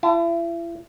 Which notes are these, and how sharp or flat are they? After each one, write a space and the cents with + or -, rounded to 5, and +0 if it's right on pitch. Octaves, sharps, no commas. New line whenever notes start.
E4 +40 A5 +0